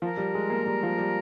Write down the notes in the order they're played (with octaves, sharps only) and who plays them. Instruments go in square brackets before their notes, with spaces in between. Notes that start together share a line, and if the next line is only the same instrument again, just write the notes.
[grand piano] F3 [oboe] A#4
[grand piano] G3
G#3
A#3
G3
F3
G3